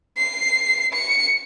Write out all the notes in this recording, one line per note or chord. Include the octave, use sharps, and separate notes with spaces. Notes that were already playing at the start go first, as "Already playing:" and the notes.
C7
C#7